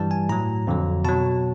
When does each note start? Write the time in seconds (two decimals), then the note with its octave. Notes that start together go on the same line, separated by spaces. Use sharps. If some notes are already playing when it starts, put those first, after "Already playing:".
Already playing: G2 E3 G3 A5
0.11 G#5
0.29 A2 F#3 A#5
0.67 F2 D3 F#3
1.04 B2 F#3 A5